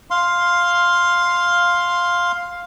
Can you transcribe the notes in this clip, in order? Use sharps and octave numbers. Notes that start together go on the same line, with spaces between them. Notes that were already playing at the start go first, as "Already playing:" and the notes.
F5 C6